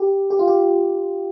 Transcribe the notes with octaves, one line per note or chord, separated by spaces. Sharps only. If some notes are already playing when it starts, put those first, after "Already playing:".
Already playing: G4
G4
F4
G4